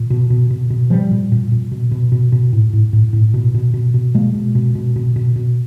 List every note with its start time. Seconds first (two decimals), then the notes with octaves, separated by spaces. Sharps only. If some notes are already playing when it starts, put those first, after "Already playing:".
Already playing: A#2
0.10 B2
0.30 B2
0.50 B2
0.70 B2
0.90 A#2 F3 G3
1.11 A#2
1.32 A#2
1.52 A#2
1.72 B2
1.91 B2
2.12 B2
2.32 B2
2.53 A2
2.73 A2
2.93 A2
3.13 A2
3.34 B2
3.54 B2
3.74 B2
3.94 B2
4.14 B2 G#3 A#3
4.35 B2
4.55 B2
4.75 B2
4.96 B2
5.16 B2
5.36 B2